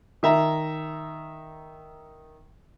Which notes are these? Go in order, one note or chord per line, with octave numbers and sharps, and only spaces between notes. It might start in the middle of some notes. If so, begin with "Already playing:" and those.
D#3 E5 A#5